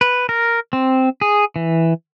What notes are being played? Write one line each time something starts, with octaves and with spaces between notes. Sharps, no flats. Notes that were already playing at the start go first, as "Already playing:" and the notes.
B4
A#4
C4
G#4
E3